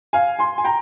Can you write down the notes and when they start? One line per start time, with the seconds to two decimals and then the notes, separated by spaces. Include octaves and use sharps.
0.13 F5 G#5
0.39 G#5 C6
0.58 G#5
0.64 G5 A#5